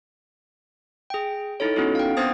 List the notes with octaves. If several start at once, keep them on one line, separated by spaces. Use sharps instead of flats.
G#4 G5
D#4 E4 A4 C#5
B3 C#4 D#4 E4 F#4 A4
F5 G5
B3 C4 D4 C5 D#6 A6